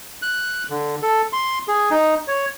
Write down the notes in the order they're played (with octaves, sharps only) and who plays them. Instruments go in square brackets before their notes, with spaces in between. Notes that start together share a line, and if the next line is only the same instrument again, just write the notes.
[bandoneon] F#6
D3
A4
C6
G#4
D#4
C#5